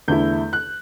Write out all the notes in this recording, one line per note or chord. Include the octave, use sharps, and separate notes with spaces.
E2 D3 A3 E4 G6
F#6